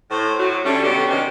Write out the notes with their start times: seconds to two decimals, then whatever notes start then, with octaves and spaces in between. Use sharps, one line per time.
0.10 A2 C5
0.39 A2 F#3
0.65 D3 G3 A3 C#4
0.83 B2 D3 F#3 F#4 G4
1.09 C3 D#3 F#3 C#4 G4